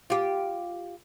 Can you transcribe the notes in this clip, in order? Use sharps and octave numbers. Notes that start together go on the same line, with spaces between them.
F4 G4